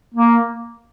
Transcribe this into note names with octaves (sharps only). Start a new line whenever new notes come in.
A#3